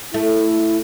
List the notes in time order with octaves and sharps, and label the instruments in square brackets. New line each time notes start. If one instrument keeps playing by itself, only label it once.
[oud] A3 [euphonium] E4